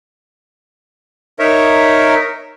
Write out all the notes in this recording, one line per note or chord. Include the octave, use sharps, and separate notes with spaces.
D#4 A#4 C#5 E5